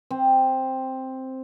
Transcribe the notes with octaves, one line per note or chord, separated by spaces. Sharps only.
C4